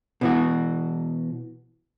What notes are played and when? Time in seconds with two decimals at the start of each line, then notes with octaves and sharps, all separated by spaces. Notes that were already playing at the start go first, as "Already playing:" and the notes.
0.21 B2 E3 F#4